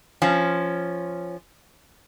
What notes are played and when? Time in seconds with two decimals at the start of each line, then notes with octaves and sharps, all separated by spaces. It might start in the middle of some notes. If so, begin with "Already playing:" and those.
0.22 F3 C#4